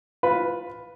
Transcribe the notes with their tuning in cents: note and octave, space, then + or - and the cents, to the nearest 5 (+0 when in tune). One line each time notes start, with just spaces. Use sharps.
F4 +15 B4 +0